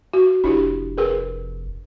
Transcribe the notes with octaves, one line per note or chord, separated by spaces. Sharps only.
F#4
F1 D4 E4 G4
G#4 A#4 B4